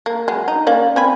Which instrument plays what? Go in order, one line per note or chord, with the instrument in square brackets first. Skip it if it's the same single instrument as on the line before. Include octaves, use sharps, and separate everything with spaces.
[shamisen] A#3
F#3 G#3
D#4
A#3 C#4 D5
C4 G#5 B5